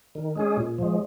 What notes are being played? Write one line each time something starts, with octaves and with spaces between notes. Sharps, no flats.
D#3
G#3 C#4 G#4
A#2
F3 G#3